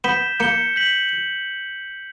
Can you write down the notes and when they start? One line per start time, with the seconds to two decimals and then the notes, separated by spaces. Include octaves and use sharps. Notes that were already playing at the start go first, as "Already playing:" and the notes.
0.04 B3 G6 B6 E7 G7
0.40 A#3 G6 C#7 G7
0.76 G6 B6 F#7